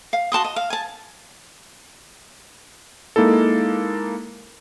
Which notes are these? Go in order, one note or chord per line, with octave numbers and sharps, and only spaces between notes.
F5
F#4 A5 C6 D#6
D#5
F5
G#5 A5
G#3 A#3 D#4 E4 A4